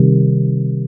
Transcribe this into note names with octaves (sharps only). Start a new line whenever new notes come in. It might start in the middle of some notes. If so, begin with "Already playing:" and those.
Already playing: C3 D#3 G3